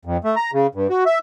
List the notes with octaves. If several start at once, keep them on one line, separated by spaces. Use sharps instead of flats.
F2
A3
A#5
C#3
G2
F#4
E5